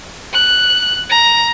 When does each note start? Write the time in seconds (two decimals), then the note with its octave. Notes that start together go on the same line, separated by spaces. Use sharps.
0.33 F#6
1.10 A#5